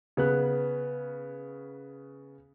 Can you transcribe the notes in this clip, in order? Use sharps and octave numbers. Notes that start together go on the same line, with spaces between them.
C#3 B3 F#6